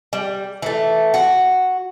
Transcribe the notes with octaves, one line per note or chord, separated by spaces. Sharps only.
G3
E3 A3
F#4